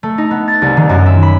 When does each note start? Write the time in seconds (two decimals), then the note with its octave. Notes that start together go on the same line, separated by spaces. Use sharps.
0.03 A3
0.18 D#4
0.31 B3
0.48 A6
0.62 C2
0.77 D#3
0.89 F#2
1.06 E5
1.23 B5